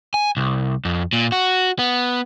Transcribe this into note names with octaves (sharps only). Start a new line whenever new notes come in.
G#5
C2
F2
A#2
F#4
B3